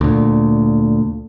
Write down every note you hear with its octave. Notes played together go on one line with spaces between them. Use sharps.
D2 A#2